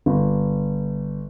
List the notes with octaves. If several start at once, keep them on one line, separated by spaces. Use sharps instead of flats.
G1